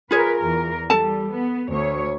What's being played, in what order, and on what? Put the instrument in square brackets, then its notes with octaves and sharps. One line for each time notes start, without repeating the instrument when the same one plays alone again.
[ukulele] F4 G#4 C#5 [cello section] A#4 B4
[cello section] E2 A#4
[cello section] G3 [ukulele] A4 A5
[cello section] B3
D2 C#5